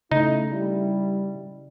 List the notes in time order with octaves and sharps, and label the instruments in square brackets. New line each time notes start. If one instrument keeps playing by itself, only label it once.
[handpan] C#3 [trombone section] A3 E4 [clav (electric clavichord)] D#4
[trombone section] G3 E4